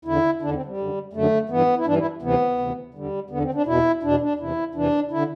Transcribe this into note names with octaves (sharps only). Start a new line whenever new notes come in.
E2 D3 E4
E2 D3 D4
C4
G3
F#2 D3
F#2 D3 A3
G2 E3 B3
E4
G2 E3 D4
E4
D2 C3 E3 B3
D2 C3 E3
E2 D3 G3
E2 D3 B3
C4
D4
E2 B2 E4
E2 B2 D4
D4
E2 C3 E3 E4
E2 C3 E3 D4
D3 E4